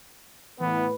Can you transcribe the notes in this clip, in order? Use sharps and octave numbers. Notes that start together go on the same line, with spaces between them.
A2 E3 B3 B4